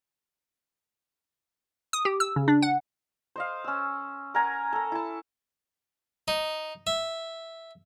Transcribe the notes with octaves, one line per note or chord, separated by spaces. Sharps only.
D#6
G4
E6
C#3
D4
F#5
C5 D#5 F5
C#4 E6
A#4 F#5 G#5 A#5
A4 A#5
E4 A5
D#4
E5